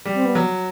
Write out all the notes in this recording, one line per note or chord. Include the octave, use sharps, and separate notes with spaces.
G3
C4
B3
F#3